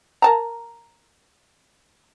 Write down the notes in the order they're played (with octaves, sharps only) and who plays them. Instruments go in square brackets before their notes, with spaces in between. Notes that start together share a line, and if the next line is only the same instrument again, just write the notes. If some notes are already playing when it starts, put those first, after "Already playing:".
[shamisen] A#4 A5 A#5